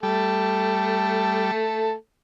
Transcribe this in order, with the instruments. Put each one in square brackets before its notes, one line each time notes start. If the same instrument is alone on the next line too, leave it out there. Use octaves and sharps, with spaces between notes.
[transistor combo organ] G3 [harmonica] A3 A4